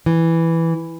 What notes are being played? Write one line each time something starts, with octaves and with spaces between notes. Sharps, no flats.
E3